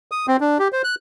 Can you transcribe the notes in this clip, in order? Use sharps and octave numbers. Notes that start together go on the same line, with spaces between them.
D#6
C4
D4
G4
C5
F#6